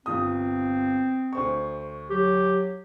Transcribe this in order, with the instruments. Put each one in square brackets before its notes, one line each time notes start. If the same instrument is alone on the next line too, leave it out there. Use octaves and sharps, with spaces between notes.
[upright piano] G1 F4 D#6 [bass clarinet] C4
[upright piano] D2 C5 C#6
[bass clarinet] F#3 [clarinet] G4